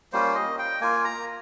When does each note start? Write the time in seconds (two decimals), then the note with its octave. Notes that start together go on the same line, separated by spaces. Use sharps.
0.13 G3 A#3 C#4 F4 C5
0.35 D#5
0.59 G5
0.81 A#3 F4 G#5
1.05 A#5